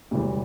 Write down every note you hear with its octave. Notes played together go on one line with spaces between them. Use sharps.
E1 D2 C3 E3 G3